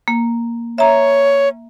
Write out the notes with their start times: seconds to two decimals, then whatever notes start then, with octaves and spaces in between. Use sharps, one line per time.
0.08 A#3
0.78 C#5 E5 A#5